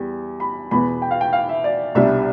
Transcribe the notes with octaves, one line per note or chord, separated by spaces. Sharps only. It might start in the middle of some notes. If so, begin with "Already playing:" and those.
Already playing: E2 G3
B5
E2 B2 B3 B5
G5
F5
G5
F5
E5
D5
C2 B2 G3 D4 E5